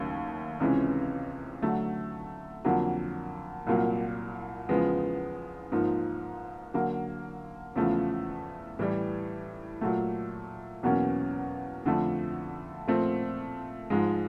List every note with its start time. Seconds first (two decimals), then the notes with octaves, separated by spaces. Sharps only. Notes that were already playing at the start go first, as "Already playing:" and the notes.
Already playing: D#2 C#3 F#3 A3
0.60 C#2 C3 E3 G#3 C#4
1.62 D3 F#3 A3
2.65 F2 D3 F#3 A#3
3.67 C2 A#2 F#3 A#3
4.69 E2 C#3 F3 G#3 B3
5.72 G#2 F3 A#3 D#4
6.74 D3 F#3 A#3
7.76 E2 C#3 F3 A3
8.79 A2 E3 G3
9.81 A#2 F#3 A3
10.83 E2 B2 F#3 A#3 C#4
11.85 F2 D3 F3 A3
12.87 A#2 F3 A3 C4
13.90 G#2 F3 G#3